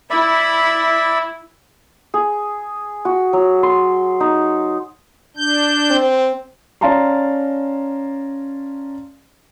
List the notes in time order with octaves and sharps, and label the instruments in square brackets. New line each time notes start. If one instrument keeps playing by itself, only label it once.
[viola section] E4 [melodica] D5 E5 B5
[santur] G#4
F#4
F#3
C6
D#4
[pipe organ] D4 G6
[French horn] C4
[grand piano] C#4 D5 F5 A5 A#5 C6